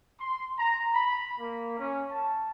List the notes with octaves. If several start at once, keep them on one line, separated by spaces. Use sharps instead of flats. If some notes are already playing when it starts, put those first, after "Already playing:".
C6
A#5
B5
A#3
C#4
A5